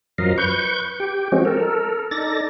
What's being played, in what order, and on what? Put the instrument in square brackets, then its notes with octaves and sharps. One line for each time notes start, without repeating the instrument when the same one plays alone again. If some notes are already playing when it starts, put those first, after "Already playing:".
[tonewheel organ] F#2 F3 F#3 A#4 D#5 F5
B4 C#6 G6
G4 G5
F3 G#3 C4 C#4 F#4
A4 A#4
D#4 A4 D5 A6 A#6